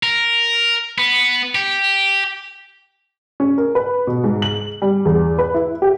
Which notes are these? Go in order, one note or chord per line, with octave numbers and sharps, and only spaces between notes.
A#4
B3
G4
C#4
A#4
B4
B2
G#2
F#7
G3
E2
B4
E4
G4